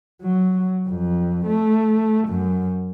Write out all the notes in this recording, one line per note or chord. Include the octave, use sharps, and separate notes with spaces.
F#3
F2
A3
F#2